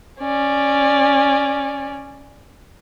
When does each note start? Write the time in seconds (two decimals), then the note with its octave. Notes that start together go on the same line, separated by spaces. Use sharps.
0.19 C#4 D5